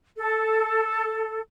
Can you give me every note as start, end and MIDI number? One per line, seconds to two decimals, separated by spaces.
0.17 1.39 69